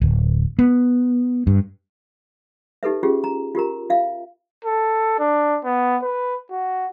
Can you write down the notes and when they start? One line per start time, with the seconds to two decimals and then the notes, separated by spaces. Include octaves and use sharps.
0.01 D1
0.59 B3
1.47 G2
2.83 D#4 G4 A4 B4 E5
3.03 C#4 F4 G4 G#4
3.24 A#5
3.55 F4 G4 A#4 A#5
3.90 F4 E5 F5
4.65 A4
5.19 D4
5.64 B3
6.03 B4
6.51 F#4